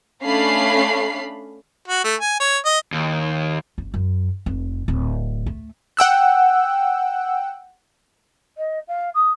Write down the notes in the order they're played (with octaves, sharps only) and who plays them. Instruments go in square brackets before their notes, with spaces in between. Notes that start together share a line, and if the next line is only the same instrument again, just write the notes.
[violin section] A3 C#4 D4 F5 B5 C7
[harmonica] F#4
A3
G#5
C#5
D#5
[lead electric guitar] D#2
[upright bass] F#1
F#2
F1
D1
A3
[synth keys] F#5 G5 E6 F#6
[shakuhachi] D#5
F5
D#6